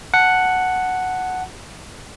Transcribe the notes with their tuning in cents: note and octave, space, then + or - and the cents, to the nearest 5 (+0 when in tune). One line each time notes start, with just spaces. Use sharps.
F#5 +0 A5 +0